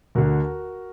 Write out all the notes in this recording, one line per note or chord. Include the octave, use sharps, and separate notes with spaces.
D2 D3 F#4 A#4